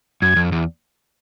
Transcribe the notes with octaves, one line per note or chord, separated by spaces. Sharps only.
F#2 G#6
F2
E2